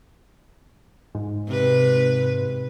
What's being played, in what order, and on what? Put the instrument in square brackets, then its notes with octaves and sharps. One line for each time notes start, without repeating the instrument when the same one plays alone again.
[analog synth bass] G#2
[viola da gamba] C3 B4